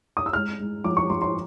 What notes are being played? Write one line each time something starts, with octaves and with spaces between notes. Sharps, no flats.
D#6
E6
G#3 F6
G#3
F3 D6
C#6
F3 C6
C6